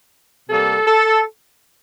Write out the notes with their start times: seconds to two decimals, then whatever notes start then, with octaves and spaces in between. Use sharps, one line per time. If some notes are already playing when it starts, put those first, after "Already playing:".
0.49 C3 G3 A#3 A4
0.87 A4